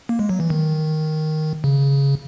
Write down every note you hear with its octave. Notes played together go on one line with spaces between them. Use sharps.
A#3
G#3
F#3
E3
D#3
C#3